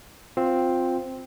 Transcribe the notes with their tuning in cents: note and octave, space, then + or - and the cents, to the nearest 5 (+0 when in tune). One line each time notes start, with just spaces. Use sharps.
C4 +0 F4 +10